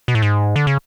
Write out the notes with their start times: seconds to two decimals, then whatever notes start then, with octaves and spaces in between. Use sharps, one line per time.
0.08 B2
0.15 A2
0.22 G#2
0.56 D3
0.67 C#3